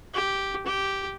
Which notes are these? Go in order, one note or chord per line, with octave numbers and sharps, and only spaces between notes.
G4
G4